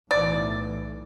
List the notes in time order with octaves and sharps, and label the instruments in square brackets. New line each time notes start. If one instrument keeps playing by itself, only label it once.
[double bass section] B1 A2 E3 [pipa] D5